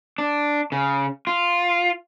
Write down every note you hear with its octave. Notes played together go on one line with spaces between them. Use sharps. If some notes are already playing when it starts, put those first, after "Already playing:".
D4
C#3
F4